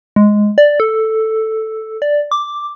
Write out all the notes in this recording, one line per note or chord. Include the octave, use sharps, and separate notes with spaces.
G#3
D5
A4
D5
D6